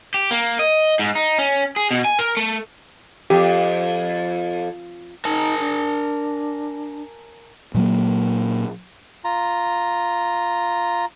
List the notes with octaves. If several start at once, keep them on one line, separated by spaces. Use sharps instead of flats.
G4
A#3
D#5
G#2
D#4
C#4
G#4
B2
G#5
A#4
A3
F2 G4
D#4 A#4 G#5 A5
D4
A#2 F#3 A#3
F4 A#5